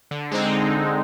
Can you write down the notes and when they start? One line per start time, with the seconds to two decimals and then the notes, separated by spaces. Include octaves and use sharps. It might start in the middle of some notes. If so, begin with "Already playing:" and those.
0.11 D3
0.31 G#3 C4 D#4